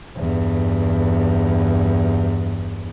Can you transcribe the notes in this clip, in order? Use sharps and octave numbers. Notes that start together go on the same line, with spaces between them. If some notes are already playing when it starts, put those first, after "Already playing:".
E2 G2